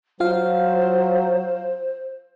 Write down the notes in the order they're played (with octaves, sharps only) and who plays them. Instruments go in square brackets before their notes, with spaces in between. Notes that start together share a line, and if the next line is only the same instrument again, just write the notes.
[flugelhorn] F#3 [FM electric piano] F4 F5 [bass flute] C5